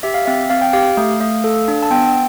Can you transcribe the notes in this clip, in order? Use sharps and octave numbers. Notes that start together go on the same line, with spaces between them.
G4 E5
F5
C4 E5
C4 F5
G5
G4 F5
A3
A3
A4
D4
A5
B3 G5
G5